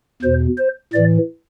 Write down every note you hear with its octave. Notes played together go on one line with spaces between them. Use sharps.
E2 B2 C5
C5
A2 E3 D5